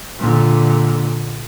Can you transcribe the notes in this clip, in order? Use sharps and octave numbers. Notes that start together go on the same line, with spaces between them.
A#2 D3